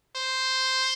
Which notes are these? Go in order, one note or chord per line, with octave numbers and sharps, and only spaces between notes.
C5